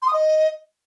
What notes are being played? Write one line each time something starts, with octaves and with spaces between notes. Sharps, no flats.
C6
D#6
D#5